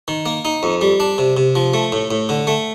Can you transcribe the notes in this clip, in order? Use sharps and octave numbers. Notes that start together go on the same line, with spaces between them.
D#3
A#3
D#4
F2
G3
D4
C3
C3
F3
A3
A2
A2
D3
A3